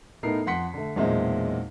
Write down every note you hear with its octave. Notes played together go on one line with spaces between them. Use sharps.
A2 B3 D#4 A4 A#4 C7
F2 F#5 C6 B6 C#7
D3 A3
B1 E2 A#2 G#3 C4 E5